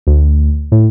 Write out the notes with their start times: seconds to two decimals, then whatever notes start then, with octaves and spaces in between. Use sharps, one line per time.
0.07 D2
0.72 A2